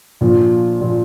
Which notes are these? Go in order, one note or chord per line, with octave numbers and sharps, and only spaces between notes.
A#1 A#2 F3
A#2 F3